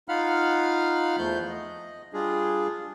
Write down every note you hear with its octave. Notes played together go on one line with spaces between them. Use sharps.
D#4 F4 F5 F#5 B5 F6
E2 F3 A3 G6
D#5
G3 D4 F4 G#4